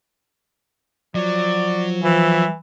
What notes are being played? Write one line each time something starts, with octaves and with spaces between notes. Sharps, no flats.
F3 F#3 D5
E3 F3 E5